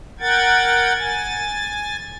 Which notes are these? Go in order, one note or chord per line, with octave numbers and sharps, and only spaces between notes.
A#4 F#5 G5 G#6 A6
G#5 A6